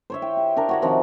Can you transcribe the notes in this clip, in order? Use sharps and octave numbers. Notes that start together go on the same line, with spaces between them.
C5 C#5 E5
G5
G4
D4 A#4
F#4 C#5 F#5
C3 D#3 F3